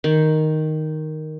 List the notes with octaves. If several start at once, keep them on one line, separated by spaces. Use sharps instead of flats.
D#3